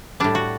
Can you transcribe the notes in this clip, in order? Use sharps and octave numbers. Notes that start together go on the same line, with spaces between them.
A2 G3 D4
F#4